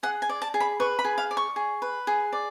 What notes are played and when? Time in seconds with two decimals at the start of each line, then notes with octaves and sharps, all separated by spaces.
0.03 G#4 F#5
0.22 G#5
0.29 D5
0.42 A5
0.54 G#4
0.60 B5
0.80 B4 C#6
0.99 B5
1.05 G#4
1.18 F5
1.31 D5
1.37 C#6
1.56 G#4
1.82 B4
2.07 G#4
2.33 D5